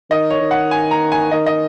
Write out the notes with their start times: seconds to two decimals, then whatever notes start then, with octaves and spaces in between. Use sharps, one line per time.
0.10 D#3 D#5
0.30 C#5
0.41 D#3
0.51 F#5
0.71 G#5
0.91 A#5
1.12 G#5
1.31 D#3 D#5
1.46 D#5